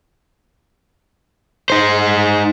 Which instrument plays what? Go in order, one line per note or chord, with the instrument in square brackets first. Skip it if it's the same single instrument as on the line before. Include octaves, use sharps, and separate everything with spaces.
[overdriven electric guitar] D#4 C5